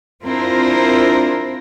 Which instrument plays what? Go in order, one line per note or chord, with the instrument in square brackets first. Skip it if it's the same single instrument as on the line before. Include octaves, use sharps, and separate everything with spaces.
[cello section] C4 D4 E4 F4 A#4 C5